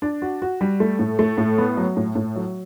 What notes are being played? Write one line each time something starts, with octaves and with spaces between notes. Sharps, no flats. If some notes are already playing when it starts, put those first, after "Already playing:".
D4
F#4
F#4
G3
A3
A2
A3
A2
B3
F#3
A2
A2
F#3